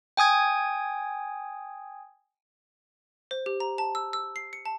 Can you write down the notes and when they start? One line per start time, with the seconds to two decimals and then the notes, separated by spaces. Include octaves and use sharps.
0.17 G5 G#5 D#6 G#6
3.31 C5
3.46 G4
3.60 A#5
3.78 A5
3.95 E6
4.13 E6
4.36 C7
4.53 C#7
4.66 A5